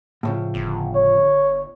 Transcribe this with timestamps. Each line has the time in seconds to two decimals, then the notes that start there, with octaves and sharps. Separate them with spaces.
0.23 A2 C#3 F3
0.54 G1
0.95 C#5